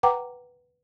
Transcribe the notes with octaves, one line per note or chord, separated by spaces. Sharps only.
B4 F#5 G5 A#5 D6